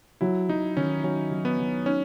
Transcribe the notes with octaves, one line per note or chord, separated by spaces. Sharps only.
F#3 E4
F#3 D#4
D#3 C#4
F#3 C#4
F#3
B3
F#3
C#4 D#4